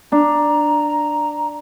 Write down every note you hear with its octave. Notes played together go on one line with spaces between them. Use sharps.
D4 A#5